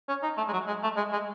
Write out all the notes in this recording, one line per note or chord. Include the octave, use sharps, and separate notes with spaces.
C#4
D#4
A3
G#3
F#3
G#3
A3
G#3
G#3